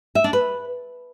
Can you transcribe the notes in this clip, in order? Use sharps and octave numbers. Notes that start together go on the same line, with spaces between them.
E5
D4
B4